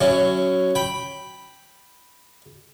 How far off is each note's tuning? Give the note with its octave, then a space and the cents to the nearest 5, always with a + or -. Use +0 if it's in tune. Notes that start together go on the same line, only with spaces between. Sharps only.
F#3 +10 C#4 +0 E4 +15
G5 +0 B5 +0